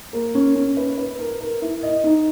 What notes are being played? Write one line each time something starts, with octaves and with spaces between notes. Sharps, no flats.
A#3
C#4
C#4
B4
B4
A#4
A#4
E4
D#5
D#4